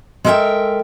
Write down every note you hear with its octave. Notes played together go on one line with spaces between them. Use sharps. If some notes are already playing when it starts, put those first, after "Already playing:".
G#3 A4 A#4 C5 E5 G5